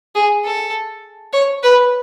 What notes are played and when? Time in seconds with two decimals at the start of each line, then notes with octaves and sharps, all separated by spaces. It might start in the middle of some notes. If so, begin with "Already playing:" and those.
0.15 G#4
0.45 A4
1.33 C#5
1.63 B4